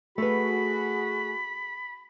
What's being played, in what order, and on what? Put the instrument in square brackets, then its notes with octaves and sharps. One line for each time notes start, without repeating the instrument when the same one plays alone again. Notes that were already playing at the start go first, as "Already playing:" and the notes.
[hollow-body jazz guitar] A3 B4 [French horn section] F#4 G#4 [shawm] B5